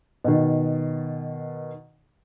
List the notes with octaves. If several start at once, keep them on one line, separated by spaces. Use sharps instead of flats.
B2 D#3